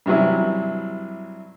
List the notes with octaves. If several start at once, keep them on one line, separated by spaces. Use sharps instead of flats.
G2 C3 E3 F#3 E4